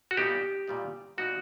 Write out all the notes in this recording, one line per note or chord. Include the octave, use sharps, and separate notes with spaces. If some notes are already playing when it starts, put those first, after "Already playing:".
F#4
A#2 G3 B3 D#4 G4
A#2 G3 B3 D#4
A#2 G3 B3 D#4 F#4